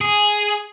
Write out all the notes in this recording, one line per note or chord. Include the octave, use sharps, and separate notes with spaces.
G#4